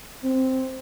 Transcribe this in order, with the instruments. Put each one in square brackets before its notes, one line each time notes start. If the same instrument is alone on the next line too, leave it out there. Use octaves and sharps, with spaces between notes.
[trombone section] C4